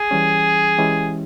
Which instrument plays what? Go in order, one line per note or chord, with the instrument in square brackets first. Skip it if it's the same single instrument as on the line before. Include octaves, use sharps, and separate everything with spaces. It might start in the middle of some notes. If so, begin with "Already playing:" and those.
Already playing: [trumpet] G#4
[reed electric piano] E3 G3 C#4
E3 G#3 C#4 E4 G4